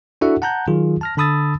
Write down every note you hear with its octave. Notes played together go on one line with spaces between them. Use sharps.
D4 E4 F#4 A4 E5 F#5
F#5 A5 A#5 F#6 G6
D#3 F#3 F4 G#4
A5 F6 A#6
D3 A5 B5 D#6 E6 A6